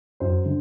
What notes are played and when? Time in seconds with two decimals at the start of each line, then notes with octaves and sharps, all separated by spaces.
0.20 F#2 C5
0.46 D3